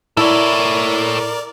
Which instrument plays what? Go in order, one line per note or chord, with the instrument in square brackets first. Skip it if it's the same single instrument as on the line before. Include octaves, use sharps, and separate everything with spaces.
[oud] E4 [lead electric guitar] A4 C#5 [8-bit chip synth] A#4 D5